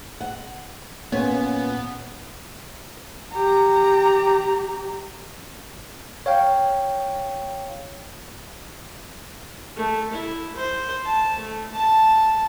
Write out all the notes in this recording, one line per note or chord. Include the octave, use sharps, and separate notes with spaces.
F#5
A#2 B3 C#4 C#5
G4 A#5
C#5 F5 G5
A3
E4
C5
A5
A3
A5